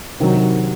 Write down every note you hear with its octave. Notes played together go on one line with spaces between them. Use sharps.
C3 D#3 F#3